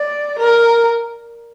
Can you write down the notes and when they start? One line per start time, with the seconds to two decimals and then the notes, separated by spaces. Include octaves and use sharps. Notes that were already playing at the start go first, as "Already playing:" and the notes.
Already playing: D5
0.38 A#4